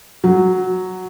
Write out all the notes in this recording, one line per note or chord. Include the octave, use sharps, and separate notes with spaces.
F#3